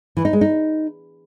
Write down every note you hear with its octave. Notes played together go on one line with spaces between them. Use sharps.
E3
D#4
G#3
D#4